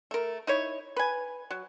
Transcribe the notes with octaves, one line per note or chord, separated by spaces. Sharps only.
A3 A#4
D#4 E4 C#5
B4 G#5
F#3